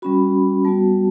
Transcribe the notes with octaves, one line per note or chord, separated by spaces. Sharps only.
G3 C#4 F#4 B5
G3 B3 F#4 A5